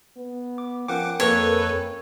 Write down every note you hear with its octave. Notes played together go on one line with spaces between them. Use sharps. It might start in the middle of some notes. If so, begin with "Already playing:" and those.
B3
D6
F3 C#4 A#4 F#5 G5 D6
F2 A#3 A4 B4 C#5